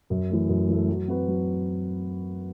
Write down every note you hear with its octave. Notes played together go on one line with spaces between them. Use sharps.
F#2
E3 A3
F#2
E3 A3
F#3
C4 F#4 B4
F#3